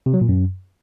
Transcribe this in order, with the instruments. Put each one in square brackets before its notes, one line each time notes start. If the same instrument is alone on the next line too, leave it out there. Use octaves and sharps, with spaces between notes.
[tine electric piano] C3
F#3
A#2
F#2